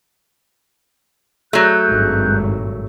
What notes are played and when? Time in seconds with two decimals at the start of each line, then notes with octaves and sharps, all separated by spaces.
1.53 F#3 A3 G#4 F#6 G6
1.87 G#1 G2 A#2